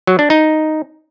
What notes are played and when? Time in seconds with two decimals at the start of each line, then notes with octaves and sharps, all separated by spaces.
0.07 F#3
0.19 D4
0.30 D#4